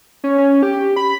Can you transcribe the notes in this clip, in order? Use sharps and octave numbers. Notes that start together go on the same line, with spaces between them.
C#4
C#4
G4
B5